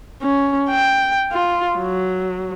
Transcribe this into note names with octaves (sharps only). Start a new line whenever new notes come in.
C#4
G5
F4
F#3